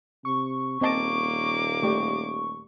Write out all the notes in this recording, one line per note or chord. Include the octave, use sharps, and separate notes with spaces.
C3 C#6
D#1 A#3 C4 D#5 A5 D6
A3 G4 D5 C#6